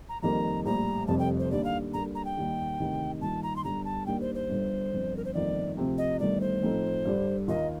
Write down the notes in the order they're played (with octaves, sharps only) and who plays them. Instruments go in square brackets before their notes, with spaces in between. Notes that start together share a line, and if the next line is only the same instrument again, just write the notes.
[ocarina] A#5
[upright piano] F2 D#3 G3 A#3 [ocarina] A#5
[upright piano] A#1 A2 G3 [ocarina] A#5
[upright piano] F1 F2 C3 G3 [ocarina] A5
[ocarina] G5
C5
[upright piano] D#2 D3 G3 [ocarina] D5
[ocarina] F5
[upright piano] D3 G3 A#3 [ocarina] A#5
[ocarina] A#5
G5
[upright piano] D#2 D#3 G3
D2 C3 D#3
[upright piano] G2 D#3 A#3 F4 [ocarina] A5
[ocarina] A#5
C6
[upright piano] G1 G2 D3 G3 [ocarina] A#5
[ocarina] A5
[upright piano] D#2 D#3 G3 A#3 D4 [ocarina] G5
[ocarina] C5
C5
[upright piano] G1 G2 D3
G1 F2 D3
[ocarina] A#4
C5
[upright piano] G1 F2 D#3 A#3 F4 [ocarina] D5
[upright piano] D2 C3 F3 C4
[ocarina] D#5
[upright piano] G1 G2 D#3 A3 [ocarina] D5
[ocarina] C5
[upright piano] A2 F3 C4 D#4 A4
G2 D3 G3 D4
[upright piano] D#2 D#3 A#3 F4 A#4 [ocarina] D#5